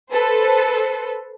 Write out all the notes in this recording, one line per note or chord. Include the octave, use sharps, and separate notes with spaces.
A4 B4 C5